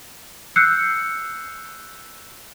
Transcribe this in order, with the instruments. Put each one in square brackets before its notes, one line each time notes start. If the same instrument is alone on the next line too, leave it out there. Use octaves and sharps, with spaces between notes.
[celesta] E6 F#6 G6 C7 C#7